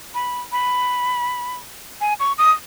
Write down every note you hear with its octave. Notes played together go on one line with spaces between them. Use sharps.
B5
B5
G#5
C#6
D#6